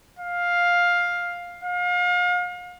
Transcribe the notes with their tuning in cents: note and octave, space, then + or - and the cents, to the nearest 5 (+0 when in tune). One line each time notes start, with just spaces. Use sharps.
F5 +10
F5 +35